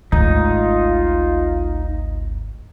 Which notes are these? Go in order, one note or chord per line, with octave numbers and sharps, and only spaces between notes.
G#1 D2 D#4 F4